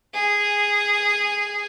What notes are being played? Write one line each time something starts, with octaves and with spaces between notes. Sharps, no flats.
G#4